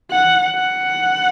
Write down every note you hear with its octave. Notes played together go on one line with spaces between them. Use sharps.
F#5
F#5